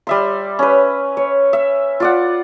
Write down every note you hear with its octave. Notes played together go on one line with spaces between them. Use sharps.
G3 E5 C6
C#4 B4
C#5
E5
F4 D5 F#5